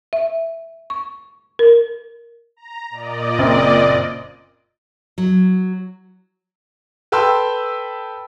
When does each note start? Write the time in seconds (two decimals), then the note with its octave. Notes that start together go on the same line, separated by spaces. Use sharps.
0.13 E5
0.90 C#6
1.59 A#4
2.57 A#5
2.90 A#2 D5 D#5
3.38 F#1 C4
5.18 F#3
7.12 A4 B4 G5 A5 C6 E6